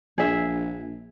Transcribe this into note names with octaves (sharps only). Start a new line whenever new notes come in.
A#1 G#4 E5